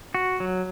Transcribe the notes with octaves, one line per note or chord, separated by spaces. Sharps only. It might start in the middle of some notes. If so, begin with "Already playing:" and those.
F#4
F#3